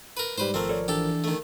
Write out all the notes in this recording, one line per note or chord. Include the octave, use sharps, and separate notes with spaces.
A#4 B4
G#2 G3 B4 C5
G#1 F3 A3 C4 A#4
A4 C#5 D5
E3 D4 G4 A4
D#3 A3